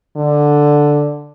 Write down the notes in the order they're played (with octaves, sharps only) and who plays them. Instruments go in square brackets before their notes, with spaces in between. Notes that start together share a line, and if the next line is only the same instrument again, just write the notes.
[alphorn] D3